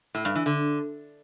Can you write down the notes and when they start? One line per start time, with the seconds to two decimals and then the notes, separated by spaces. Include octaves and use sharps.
0.15 A2
0.25 G2
0.35 E3
0.46 D3